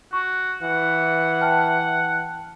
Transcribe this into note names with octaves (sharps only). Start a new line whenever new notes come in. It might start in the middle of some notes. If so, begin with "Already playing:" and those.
F#4 C#6
E3 F#5
G5 A5 F6